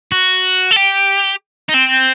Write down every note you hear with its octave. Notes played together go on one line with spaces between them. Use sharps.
F#4
A4
G4
D#4
C4